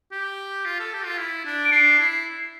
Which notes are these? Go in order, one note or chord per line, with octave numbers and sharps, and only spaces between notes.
G4
F4
A4
G4
F4
E4
D4
D7
D4 C7
E4